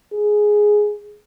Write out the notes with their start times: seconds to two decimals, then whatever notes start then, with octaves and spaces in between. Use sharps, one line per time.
0.13 G#4